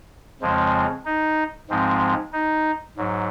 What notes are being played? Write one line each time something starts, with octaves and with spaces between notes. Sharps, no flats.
F2 C#3 F3 G#3 C4
D#4
G#2 F3 G#3 C4
D#4
G#2 F#3